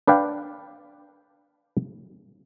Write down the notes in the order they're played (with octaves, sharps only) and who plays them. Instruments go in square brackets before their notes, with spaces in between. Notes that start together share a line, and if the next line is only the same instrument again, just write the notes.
[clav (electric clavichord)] D4 B4 D5 F5 G5